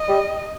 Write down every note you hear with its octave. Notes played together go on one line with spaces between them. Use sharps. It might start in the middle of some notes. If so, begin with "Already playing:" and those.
Already playing: D#5
G3